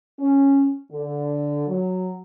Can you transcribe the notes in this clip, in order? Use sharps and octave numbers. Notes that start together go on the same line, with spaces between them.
C#4
D3
F#3